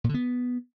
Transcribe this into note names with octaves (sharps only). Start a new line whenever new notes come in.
A#2
D3
B3